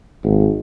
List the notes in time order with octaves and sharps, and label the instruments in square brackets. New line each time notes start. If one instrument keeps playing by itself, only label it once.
[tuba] G#1